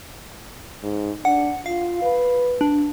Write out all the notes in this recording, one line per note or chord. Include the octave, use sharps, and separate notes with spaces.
G#2
D4 F#5
F4 F5
B4
D4